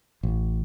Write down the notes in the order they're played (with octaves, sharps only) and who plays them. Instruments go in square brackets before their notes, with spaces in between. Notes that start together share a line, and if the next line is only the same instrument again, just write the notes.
[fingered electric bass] A1